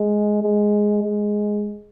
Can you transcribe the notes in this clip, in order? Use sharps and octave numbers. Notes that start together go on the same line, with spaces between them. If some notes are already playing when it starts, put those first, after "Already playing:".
Already playing: G#3
G#3
G#3